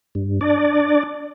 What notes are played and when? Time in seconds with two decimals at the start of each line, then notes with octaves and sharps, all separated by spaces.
0.15 G2
0.41 D4 D5